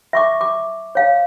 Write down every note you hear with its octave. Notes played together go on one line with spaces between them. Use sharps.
E5 C#6 D6
D6
C#5 F5